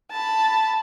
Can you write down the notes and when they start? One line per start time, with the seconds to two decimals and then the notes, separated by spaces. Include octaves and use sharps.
0.11 A5 B5